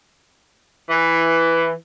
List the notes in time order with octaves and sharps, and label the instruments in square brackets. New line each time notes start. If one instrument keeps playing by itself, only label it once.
[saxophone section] E3